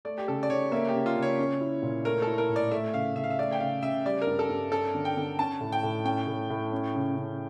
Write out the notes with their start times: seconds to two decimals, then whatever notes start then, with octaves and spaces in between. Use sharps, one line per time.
0.05 A3 D5
0.18 G4
0.28 C#3 A4
0.43 D5
0.50 C#3 C#5
0.72 A#3 E5
0.89 G4
0.95 C#3
1.06 F4
1.16 C#3
1.22 C#5
1.38 C#4
1.61 E4
1.82 A#2
2.05 A3 A#4
2.22 A4
2.27 E4
2.38 A#4
2.49 A2
2.56 D5
2.71 A3 E5
2.94 C#3 F5
3.16 C#3 E5
3.24 F5
3.30 E5
3.39 A3 D5
3.52 G5
3.60 C#3 F5
3.83 C#3 E5
4.06 G3 D5
4.22 A#4
4.27 G2
4.39 A4
4.49 G2
4.72 C#4 A4
4.95 D3
5.05 G5
5.17 D3
5.39 C#4 A5
5.61 A2
5.72 G5
5.83 A2
6.05 C#4 G5
6.27 A2
6.50 A2
6.72 C#4
6.95 C#3
7.17 C#3